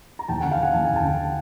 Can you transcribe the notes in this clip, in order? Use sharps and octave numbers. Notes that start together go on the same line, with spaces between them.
A#5
D#2 G5 A5
F#5 G#5
D3
F5 G5
D3 F#5 G#5
D#2 A5
D#2 G#5
G5 A5
D3